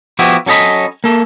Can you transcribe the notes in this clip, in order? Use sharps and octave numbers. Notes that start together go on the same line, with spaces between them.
F3 B3 E4 F#4 G4
F#3 C#4 A4 D#5 B5
A#3 A4